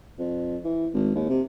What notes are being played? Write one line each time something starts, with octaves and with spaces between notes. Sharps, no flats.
F2
E3
G#1
D#2
C3